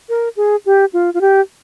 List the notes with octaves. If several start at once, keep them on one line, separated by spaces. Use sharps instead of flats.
A#4
G#4
G4
F4
F4
G4